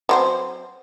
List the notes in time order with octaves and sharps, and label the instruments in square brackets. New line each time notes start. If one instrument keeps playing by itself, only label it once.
[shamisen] F#3 C4 C5